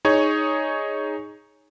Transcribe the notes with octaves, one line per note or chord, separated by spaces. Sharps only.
D#4 G#4 C#5